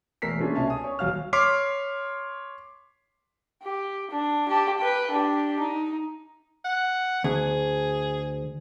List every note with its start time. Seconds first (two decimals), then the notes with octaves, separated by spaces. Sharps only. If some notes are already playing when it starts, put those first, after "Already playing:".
0.22 E1 A3 A#4 E6 B6 C7
0.41 A3 A#3 C#4 D4 F4 G#4
0.55 C2 B2 C#4 E5 A5
0.67 G#5 D#6
0.84 C#5 C#6
0.99 D#1 F#3 F5 F6
1.33 C#5 C6 D6 F6 B6 C7
3.62 G4
4.11 D4
4.48 G4 A5
4.78 B4 G5
5.11 D4 G4
5.59 D#4
6.65 F#5
7.24 D2 G#4